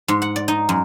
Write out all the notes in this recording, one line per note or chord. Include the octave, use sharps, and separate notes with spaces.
G#2
F#5
D5
D#4
F#2